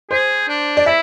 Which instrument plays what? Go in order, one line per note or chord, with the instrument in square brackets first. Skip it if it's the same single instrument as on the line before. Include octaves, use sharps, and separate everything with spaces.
[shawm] G#4 [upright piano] C5
[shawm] D4
[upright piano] D5
[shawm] E4 [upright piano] E5